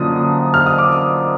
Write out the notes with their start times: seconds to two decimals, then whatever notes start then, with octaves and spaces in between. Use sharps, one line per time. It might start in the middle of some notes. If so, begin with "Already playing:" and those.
Already playing: F#2 D3 F3 A#3 D4 D#6
0.54 F6
0.66 D#6
0.79 D6